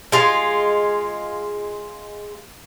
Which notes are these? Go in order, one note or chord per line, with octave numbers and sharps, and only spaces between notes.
G#3 F4